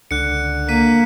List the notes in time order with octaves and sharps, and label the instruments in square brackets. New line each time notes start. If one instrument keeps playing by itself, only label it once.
[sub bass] C#2 [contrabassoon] D3 [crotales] F#6 C#7
[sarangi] A#3 [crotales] B6 D#7